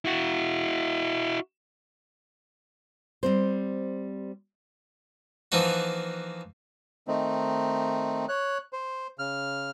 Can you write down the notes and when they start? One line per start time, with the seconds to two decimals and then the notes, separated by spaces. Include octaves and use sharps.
0.05 E4 F#4
3.23 G3 C4 C5
5.52 E3 F3 A#3 D#4 F#4
7.08 D#3 A3 C4 D#4
8.29 C#5 F#6
8.73 C5
9.19 C#3 F6